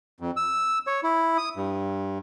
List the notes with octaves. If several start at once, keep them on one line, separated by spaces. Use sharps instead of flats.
F2
E6
C#5
E4
D#6
G2